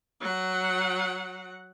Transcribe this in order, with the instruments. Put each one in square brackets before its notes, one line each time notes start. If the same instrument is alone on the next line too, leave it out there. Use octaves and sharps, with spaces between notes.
[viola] F#3 F#5